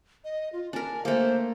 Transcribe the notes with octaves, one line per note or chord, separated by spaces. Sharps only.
D#5
F4
D4 A#4 G#5
A3 A#3 C5